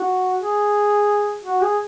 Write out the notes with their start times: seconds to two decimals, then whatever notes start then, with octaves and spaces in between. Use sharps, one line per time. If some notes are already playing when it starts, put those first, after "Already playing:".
Already playing: F#4
0.41 G#4
1.44 F#4
1.62 G#4